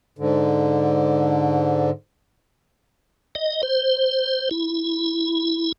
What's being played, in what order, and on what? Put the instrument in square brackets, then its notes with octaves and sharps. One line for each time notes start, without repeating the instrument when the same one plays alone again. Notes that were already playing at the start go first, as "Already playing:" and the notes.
[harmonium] G#2 D3
[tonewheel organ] D#5
C5
E4